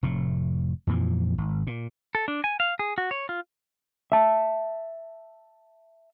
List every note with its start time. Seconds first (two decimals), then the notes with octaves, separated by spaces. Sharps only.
0.03 F1 A2
0.87 F2 A#2 E3 F3
1.38 G#1
1.67 A#2
2.15 A4
2.28 D4
2.44 G#5
2.60 F5
2.79 G#4
2.98 F#4
3.11 C#5
3.29 F4
4.12 E5 A5